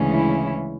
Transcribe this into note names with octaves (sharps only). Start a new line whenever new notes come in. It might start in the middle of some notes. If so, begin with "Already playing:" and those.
Already playing: D2 C#3 E3 G#3 C#4
E4